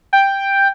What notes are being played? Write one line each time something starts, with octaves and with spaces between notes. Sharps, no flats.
G5